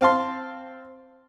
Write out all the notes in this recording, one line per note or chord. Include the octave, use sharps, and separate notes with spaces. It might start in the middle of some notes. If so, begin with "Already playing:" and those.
C4 F5 A5 C6